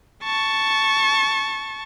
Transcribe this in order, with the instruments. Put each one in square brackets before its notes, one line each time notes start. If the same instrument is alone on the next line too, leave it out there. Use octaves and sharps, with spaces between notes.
[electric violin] A5 C#6